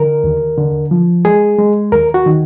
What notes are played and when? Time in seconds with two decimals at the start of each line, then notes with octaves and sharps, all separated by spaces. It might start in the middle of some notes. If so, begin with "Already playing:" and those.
Already playing: D3 A#4
0.24 D#2
0.57 D3
0.91 F3
1.25 G#3 G#4
1.59 G#3
1.92 D#2 A#4
2.14 F#4
2.26 D#3